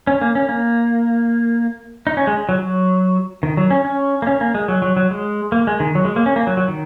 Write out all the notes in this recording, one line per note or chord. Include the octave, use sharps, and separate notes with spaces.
C#4
A#3
C#4
A#3
D#4
C#4
G#3
F#3
F#3
D#3
F#3
C#4
C#4
A#3
C#4
A#3
G#3
F#3
F#3
F#3
G#3
A#3
G#3
D#3
F#3
G#3
A#3
C#4
A#3
F#3
F#3
D#3